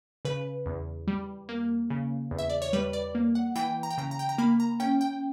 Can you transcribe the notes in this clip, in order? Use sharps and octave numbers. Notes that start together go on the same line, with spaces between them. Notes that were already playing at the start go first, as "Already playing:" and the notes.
C#3 B4
E2
G3
A#3
C#3
E2
E5
D5
C#5
G3 B4
D5
A#3
F#5
E3 G5
A#5
G5
C#3 A#5
A#5
G5
A#5
A#3 B5
A#5
C#4 G5
G5